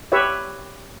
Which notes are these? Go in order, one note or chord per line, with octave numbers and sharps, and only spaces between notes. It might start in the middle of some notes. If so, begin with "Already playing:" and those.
G4 B4 C#5 E5